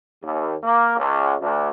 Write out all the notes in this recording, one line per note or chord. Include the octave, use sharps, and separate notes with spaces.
D#2
A#3
C#2
D2